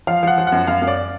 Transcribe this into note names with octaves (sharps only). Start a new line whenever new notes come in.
F3 F5
F3 F#5
F3
F#5
F#2
F#2 F5
F#2
D5